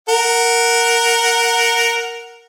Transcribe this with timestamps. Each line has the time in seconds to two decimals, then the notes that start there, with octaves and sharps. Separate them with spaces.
0.09 A#4 F#5